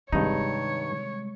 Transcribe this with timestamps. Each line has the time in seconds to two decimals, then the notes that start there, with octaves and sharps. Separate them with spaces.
0.13 G2 C3 D#3 G3 G#3 D#4 C#5